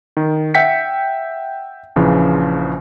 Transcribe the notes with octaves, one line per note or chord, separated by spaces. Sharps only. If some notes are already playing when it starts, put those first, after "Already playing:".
D#3
E5 F#5 G5 B6 C#7
A#1 C#3 E3 F3